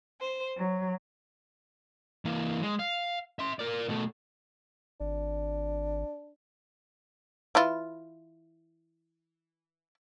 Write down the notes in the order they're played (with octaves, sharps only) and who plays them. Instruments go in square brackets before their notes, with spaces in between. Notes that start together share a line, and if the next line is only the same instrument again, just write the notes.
[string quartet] C5
F#3
[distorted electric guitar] E3 A#3
G#3
F5
E5 C6
A#4 D5
B2 A3
[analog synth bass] G#1 [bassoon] D4
[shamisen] E3 E4 F4